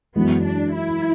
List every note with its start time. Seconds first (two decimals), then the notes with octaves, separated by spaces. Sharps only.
0.16 F#2 E3 G#3 B3
0.44 D4
0.74 E4